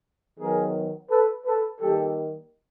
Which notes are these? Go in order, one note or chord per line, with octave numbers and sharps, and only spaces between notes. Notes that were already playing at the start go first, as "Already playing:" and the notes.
D#3 F#3 B3 G#4 A#4
A4 B4
A4 B4
D#3 G3 A#3 G4 A4